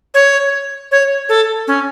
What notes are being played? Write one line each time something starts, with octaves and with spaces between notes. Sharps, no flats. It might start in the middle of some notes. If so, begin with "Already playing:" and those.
C#5
C#5
A4
C#4